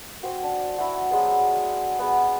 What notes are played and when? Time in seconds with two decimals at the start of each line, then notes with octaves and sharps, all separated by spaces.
0.23 F#4 C5 G5
0.43 D4
0.78 E4 F#4
1.11 F#3 G#3 B3
1.99 B3 G#4